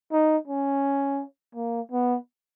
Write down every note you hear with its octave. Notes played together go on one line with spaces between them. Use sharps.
D#4
C#4
A#3
B3